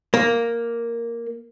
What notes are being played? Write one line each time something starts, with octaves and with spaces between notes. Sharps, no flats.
A#3